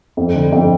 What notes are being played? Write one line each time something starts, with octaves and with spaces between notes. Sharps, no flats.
F2
D3
F2